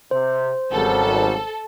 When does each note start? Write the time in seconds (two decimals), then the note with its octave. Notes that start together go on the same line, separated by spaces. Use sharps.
0.11 C3 C5
0.72 G#1 C#3 F#3 G3 A4